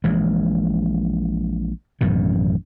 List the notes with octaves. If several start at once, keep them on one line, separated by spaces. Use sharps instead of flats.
A#1 E3 G#3
A1 F#2 B2 D#3